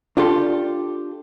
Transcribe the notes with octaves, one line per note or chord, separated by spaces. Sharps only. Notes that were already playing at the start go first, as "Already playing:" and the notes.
D4 F4 G4 A4 C6